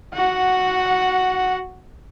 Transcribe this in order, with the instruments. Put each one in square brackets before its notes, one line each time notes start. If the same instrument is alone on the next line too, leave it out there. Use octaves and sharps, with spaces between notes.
[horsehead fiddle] F#4 F#5